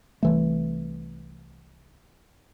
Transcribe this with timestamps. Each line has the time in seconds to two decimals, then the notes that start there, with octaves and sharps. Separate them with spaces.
0.23 C2 E3 A3